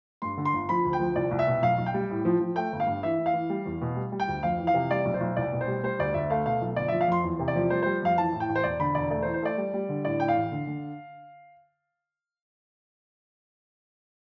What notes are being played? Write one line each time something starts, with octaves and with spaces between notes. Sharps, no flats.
G2 C6
D3
C6
G1
F3 B5
D2
G5
F3
C2 D5
C2
E5
B2
B1 F5
B1
G5
G3
A2
F3
F3
A3 G5
G1
F5
G2
E3 E5
E3
F5
E3
G3
E2
B2
G3
G3
G5
D2
F2 F5
E3
F5
C3
G3 D5
B1
C5
B1
C2 D5
B2
C5
G3
G3 C5
D2 D5
D2 E5
A3 F5
B2 F5
B1
G1 D5
F3 E5
F5
F2 C6
E2
C3
D5
F3
G3 C5
G3 C5
F2 F5
E3 A5
A2
G5
A1
C5
E1 D5
D3 B5
E1 D5
A3 D5
C5
E3
C5
A3 D5
G3
G3
D3
A2 D5
A2 G5
F5
A1
D3
D3